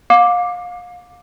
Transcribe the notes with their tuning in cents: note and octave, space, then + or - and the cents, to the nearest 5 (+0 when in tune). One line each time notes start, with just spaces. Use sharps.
F5 +30 D6 +0